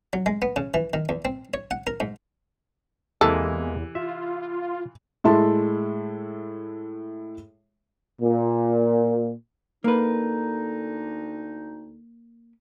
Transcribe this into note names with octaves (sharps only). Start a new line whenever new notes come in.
F#3
G#3
B3
C#3
E3
D#3
E2
C4
C#5
F#5
A#4
G#2
E2 C3 E3 G#3 A#3 E4 A4
F4 E5
A2 G#3 E4 E5 A5 C6
A#2
D2 D3 A#3 D#4 B4